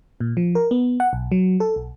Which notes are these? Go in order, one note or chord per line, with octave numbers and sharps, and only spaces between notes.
A#2
F3
A#4
B3
F#5
B1
F#3
A4
B1